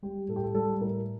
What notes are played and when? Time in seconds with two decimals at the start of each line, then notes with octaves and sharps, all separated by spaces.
0.02 G3 G4
0.28 A2 A4
0.36 G4
0.43 A4
0.54 G3 A4
0.81 A2 A#4